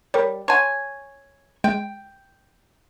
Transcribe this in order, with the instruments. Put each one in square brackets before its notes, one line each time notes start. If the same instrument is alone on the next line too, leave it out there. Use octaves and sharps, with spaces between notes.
[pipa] G3 [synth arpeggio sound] A#4 C#5
[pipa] C#5 G#5 [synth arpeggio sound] F#5 A5 C6
[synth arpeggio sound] G#3 [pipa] G5